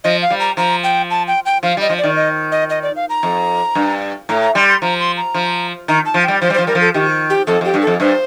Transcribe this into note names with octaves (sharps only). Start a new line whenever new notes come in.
F3 D#5
F5
G3
A#5
F3 A#5
G5
A5
G5
G5
F3 F5
G3 D#5
F3
D5
D#3
D#5
D#5
D#5
D5
F5
A#5
F2
G2
A2 A#5
A#5
G3 C6
C6
F3 A#5
C6
A#5
F3
D#3 A#5
A5
F3
G3 G5
F3 C5
G3
F3 C5
G3 A#4
F3
A4
D#3 G4
G4
F2 A4
F2 G4
G2
A4
F2
G2 C5